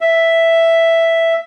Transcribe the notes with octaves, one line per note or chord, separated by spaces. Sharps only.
E5